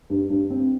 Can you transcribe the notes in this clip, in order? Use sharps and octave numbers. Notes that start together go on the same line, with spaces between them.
G2
G2
C4